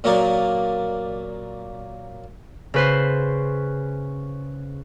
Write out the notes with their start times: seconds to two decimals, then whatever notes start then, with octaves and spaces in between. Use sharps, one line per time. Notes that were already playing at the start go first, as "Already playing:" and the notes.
0.04 A#2 F#3 A#3 A#4 D5 D#6
2.74 C#3 B4 C5